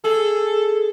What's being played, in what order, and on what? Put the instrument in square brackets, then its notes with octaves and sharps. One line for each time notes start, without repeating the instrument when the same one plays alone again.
[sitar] G#4 [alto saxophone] A4